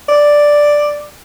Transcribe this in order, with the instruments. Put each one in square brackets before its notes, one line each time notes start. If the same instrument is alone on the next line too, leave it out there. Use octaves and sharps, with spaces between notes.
[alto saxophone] D5